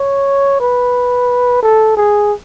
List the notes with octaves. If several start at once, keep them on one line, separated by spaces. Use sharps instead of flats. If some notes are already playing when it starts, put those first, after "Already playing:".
Already playing: C#5
B4
A4
G#4